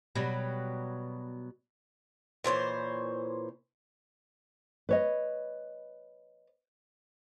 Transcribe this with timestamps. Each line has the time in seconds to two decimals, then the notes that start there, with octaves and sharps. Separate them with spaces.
0.15 B2 F#3 G3
2.44 A#2 E3 C5 C#5
4.89 B4 C#5 D#5